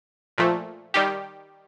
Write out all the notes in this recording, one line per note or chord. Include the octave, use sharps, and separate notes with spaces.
A#2 F3 A3
D#3 G3 G4